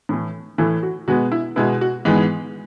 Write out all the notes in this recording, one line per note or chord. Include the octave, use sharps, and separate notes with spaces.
A2 E3 A3
A2 E3 A3 E4
F#4
B2 G#3 B3 F#4
E4
B2 G#3 B3 E4
F#4
G#2 E3 G#3 B3